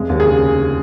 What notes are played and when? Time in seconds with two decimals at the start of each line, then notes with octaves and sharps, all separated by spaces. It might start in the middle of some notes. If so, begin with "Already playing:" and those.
Already playing: F1 G#3
0.09 D#2
0.20 G#4
0.27 C#3